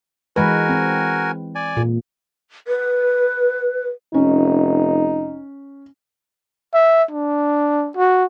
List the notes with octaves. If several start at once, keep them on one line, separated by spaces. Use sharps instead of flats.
E3 G#3 F#4 A#4 B4 G#5
C4
D5 G#5
A#2
B4
F1 C#4 D#4
E5
D4
F#4